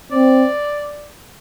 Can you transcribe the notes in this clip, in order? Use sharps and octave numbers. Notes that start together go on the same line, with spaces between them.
C4 D5